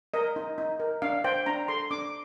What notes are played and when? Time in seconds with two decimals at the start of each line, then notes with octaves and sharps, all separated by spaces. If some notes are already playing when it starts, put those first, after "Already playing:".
0.14 A#4 D#5
0.36 D#4
0.58 D#4
0.80 A#4
1.02 D4 F5
1.24 C5 G5
1.46 D4 A#5
1.68 A4 C6
1.91 D4 D6